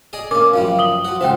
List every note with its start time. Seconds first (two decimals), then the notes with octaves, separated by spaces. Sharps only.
0.13 G#4 D5 D#5
0.31 A#3 C#4 A#4 D6
0.54 F#2 F3 G3 F5
0.79 D#6 F#7 G7
1.05 F3 F#4
1.21 C#2 F4 C5 E5 F#5 G5